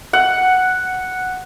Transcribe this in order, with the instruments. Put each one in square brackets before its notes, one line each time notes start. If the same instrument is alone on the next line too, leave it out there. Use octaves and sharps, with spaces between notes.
[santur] F#5